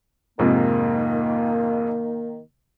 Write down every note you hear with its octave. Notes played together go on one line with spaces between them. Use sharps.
F2 G#2 C3 D#3 A#3